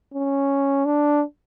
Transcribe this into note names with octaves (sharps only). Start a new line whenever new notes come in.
C#4
D4